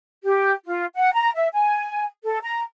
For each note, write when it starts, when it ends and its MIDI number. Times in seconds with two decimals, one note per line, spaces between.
0.24 0.52 67
0.66 0.85 65
0.95 1.13 78
1.13 1.30 82
1.36 1.48 76
1.53 2.05 80
2.24 2.38 69
2.43 2.61 82